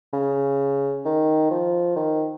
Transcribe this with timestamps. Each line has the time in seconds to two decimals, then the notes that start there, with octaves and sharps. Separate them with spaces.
0.13 C#3
1.05 D#3
1.51 F3
1.96 D#3